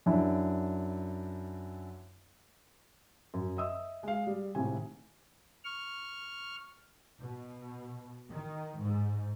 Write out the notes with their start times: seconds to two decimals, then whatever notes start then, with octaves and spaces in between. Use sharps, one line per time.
0.06 F#2 D4 E4
3.34 F#2
3.57 D#5 E5 D#6 E6
4.03 G#3 F5
4.27 G3
4.55 G#1 A2 C3 G#5
5.64 C#6 F6
7.21 B2
8.30 D#3
8.79 G#2